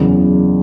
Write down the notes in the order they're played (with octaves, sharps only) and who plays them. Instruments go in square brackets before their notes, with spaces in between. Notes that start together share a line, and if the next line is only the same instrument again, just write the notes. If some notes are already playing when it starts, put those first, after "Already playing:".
Already playing: [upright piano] F#1 E2 C#3